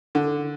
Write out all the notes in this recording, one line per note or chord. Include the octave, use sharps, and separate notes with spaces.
D3